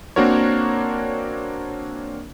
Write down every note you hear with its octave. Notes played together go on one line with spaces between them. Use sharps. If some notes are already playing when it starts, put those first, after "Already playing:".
A#3 C4 D4 F#4 A#4 C#5